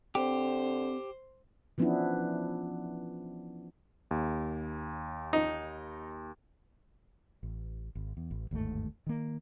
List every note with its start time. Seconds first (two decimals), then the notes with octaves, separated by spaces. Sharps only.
0.15 D3 C4 G4 C5
1.78 E3 F3 B3 C#4 D4 E4
4.11 D#2
5.33 D#4
7.43 A1
7.95 G#1
8.17 E2
8.31 A1
8.51 G1 D#2 G#2 A3
9.07 D#3 A#3